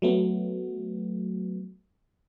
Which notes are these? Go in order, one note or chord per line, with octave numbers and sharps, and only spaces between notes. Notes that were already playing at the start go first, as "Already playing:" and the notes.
F#3 A3 B3